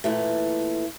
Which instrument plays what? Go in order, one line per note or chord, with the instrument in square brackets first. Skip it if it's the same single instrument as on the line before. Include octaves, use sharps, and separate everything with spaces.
[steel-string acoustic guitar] A#2 E3 A3